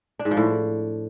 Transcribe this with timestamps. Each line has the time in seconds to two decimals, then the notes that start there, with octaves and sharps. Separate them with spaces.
0.19 D4
0.25 G#2
0.31 F3
0.37 A2